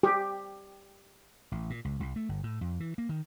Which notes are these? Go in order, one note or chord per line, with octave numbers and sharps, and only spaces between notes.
G4
A1
A#2
C#2
C2
A3
G1
A2
F2
E3
A#3
D#3